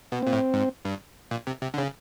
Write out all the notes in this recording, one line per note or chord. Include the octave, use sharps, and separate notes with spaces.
B2 B3
A#2 C4
A2
G#2
G2
A#2
C3
C3
D3
C#3 C#4